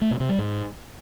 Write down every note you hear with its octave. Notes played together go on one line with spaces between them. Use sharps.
A3
B2
C3
G3
G#2